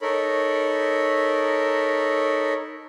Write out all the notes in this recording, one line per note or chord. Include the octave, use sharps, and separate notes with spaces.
D#4 A4 A#4 C#5 B5